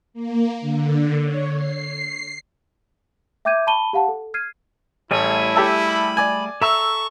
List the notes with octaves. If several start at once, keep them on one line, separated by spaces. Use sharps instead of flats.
A#3
D3
C#5
C7
E5 G5 D6 G6 G#6 D#7
A5 B5 C#6 D#7 G7
G4 F5 F#5 A5
A4
F6 G#6 C7 D#7
A1 G3 A3 E4 G#4 C#5
G4 A4 E5
B5
D5 G#5
A4 E5 A#5 C#6 E6